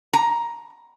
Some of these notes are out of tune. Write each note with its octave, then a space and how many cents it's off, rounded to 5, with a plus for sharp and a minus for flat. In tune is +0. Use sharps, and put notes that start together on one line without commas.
A#5 +10